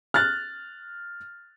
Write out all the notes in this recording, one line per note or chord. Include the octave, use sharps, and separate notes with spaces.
F6 F#6 A6